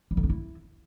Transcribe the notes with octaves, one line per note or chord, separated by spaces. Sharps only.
G3
D3
C4
E4